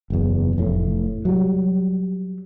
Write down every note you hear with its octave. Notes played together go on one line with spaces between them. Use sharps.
F#1 E2
F1 A2
F#3 G3